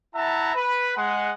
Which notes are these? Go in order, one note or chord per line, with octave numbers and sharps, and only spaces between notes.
E4 E5 F#5 A5 A#5
B4
G#3 F#5